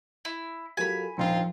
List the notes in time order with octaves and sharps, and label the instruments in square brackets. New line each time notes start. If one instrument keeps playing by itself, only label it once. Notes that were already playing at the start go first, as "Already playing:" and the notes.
[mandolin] E4
[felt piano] F#3 F4 [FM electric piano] G4 A4 A#4 [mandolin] G#5 B5
[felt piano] D#1 D4 D#4 [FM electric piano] F3 [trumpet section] C4 F4